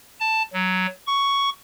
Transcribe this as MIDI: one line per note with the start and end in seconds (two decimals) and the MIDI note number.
0.20 0.42 81
0.53 0.86 54
1.07 1.49 85